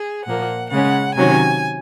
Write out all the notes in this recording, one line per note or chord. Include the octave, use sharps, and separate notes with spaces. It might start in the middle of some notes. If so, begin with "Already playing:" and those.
Already playing: G#4
A#2 F3 A#3 F#5
C#3 G#3 C#4 F#5
C3 D#3 F#3 C#4 G#5